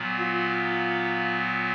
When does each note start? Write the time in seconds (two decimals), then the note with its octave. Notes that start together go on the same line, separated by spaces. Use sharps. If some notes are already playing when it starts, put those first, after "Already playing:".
Already playing: A#2 F#3 B3
0.20 F4